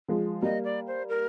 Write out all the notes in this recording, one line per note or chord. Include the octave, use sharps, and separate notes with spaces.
F3 G#3
G3 A#3 D#5
D5
C5
A#4